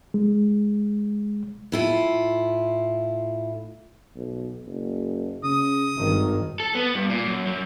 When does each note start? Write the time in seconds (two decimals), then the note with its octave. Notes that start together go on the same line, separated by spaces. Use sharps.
0.14 G#3
1.72 A2 E4 F4
4.16 B1
4.67 F#1
5.44 C#3 D#6
5.97 G#1 G2 D#3
6.60 A4
6.75 B3
6.95 G2
7.10 A#2
7.26 F#2
7.46 F#2